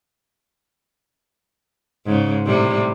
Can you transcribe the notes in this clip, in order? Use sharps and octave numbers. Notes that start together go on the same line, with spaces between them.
G#2 C#3
A2 C3 G3